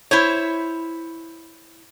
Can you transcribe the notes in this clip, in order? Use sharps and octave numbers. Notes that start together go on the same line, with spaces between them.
E4 C5 C#5